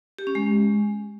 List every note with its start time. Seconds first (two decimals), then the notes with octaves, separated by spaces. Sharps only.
0.19 G4
0.27 C#4
0.35 G#3